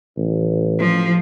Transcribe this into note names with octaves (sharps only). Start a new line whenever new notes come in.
A1
F3